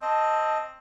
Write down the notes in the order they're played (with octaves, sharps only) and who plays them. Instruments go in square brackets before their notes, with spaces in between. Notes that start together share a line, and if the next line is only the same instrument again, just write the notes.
[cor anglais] C4 [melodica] D#5 [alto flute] A5